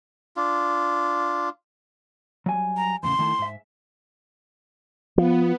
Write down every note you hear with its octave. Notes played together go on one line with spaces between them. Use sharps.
D4 F4
F#3 G3 G#5
A#5
E2 A2 C#3 C6
D#3 A3 E4
G#2 E5
F3 B3